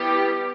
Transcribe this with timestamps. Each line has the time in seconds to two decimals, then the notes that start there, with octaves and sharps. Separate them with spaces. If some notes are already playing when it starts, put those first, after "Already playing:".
Already playing: G3 B3 E4 G4